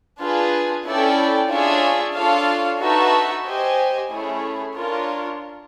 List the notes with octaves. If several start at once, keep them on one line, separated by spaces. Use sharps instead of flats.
D4 F4 G#4 B4
C#4 E4 A4 D5 G5
D4 F4 G#4 C#5 E5
D4 F4 A4 C#5 F5
D#4 F#4 B4 E5 A5
G4 C5 D#5 G#5
A3 C#4 E4 G#4 C#5
D4 F4 A#4 C#5